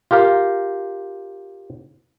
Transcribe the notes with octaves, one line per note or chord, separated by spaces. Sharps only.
F4 G4 A#4 F5